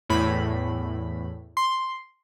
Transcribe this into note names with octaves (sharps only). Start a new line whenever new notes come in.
E2 A2 B5
C6